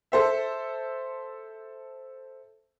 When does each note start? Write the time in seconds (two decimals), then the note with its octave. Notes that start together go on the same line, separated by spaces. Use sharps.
0.12 A4 C5 E5